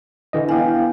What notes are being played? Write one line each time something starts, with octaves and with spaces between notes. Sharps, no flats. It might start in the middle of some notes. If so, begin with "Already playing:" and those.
D3 E3 D#5
B3 E4 F5 G5 G#5